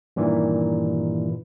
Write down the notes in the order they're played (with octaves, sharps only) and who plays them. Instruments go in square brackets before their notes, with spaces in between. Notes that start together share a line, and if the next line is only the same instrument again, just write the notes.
[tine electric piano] G2 A#2 D#3 E3